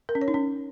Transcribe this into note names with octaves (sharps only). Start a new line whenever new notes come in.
A#4
C#4
C#5
D#4
C#4